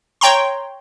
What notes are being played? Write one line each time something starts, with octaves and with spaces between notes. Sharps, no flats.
C#5 G5 A#5 C6